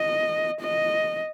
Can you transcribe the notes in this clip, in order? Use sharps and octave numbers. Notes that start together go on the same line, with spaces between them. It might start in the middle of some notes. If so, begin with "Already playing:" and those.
Already playing: D#5
D#5